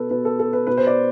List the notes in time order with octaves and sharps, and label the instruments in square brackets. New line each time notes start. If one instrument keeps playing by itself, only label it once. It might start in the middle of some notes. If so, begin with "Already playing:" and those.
Already playing: [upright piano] B2 A4 B4
B2 B4
A4
A4
B4
B2 B4
C5
D5